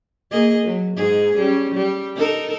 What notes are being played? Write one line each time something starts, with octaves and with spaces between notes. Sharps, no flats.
A#3 G#4 D#5
F#3
G#2 D#4 G#4
G3 C#4
G3
D#4 A4 A#4